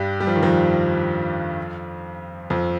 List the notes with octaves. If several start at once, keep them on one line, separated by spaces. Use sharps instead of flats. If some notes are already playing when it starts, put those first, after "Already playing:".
Already playing: G2 G3
G3
F3
D#3
F2 F3
F2 F3